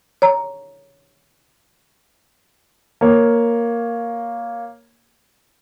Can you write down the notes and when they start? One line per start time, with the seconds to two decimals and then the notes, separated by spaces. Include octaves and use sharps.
0.22 C#5 A#5
3.01 A#3 C#5